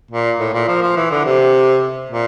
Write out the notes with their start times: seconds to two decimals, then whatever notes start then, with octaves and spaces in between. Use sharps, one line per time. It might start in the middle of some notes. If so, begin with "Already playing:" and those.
0.11 A#2
0.40 A2
0.54 A#2
0.68 F3
0.82 F3
0.96 E3
1.11 D3
1.25 C3
2.11 A#2